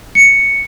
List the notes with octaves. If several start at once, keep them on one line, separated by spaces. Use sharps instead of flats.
C#7